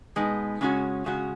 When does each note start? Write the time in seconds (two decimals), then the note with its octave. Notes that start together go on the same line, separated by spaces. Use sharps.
0.16 B2 G#3 B3 D#4
0.61 C#3 G#3 C#4 F#4
1.06 C#3 G#3 C#4 F#4